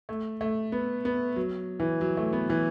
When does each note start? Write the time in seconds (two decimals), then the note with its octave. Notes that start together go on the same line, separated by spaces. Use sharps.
0.09 A3
0.41 A3
0.72 B3
1.05 B3
1.36 F#3
1.80 E3
2.01 F#3
2.17 A3
2.33 B3
2.50 E3